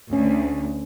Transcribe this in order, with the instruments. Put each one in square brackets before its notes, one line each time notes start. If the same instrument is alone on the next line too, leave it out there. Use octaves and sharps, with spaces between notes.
[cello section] D2 [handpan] C#4